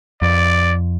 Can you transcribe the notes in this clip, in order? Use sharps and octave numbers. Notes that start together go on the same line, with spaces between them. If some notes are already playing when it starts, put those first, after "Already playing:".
F2 D5